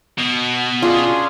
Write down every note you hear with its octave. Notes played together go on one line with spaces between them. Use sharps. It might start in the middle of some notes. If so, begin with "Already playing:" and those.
B2
C#4 D4 F4 G#4